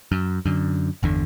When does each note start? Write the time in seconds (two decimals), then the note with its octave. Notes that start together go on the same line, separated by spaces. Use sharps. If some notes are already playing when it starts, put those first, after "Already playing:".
0.12 F#2
0.46 F#2 D3
1.03 G1 E2 D3